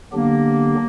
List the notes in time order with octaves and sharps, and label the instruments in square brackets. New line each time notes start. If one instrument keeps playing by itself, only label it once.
[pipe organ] D3 F#3 B3 D4 G4 [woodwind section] A#3